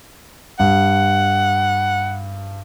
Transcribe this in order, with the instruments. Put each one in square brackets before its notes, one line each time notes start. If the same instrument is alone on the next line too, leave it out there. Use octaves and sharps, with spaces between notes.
[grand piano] G2 [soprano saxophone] F#5